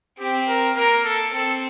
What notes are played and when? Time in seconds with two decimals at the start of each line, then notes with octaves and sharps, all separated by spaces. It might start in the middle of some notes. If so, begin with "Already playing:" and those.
0.19 C4 G4
0.48 A#4
0.76 A#3 A#4
1.05 A4
1.33 C4 A4